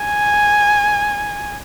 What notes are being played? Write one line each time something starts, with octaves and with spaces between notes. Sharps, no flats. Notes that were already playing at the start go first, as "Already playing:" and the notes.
Already playing: G#5